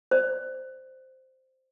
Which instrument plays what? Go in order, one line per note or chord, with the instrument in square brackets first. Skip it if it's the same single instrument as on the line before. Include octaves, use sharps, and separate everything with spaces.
[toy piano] C5 D5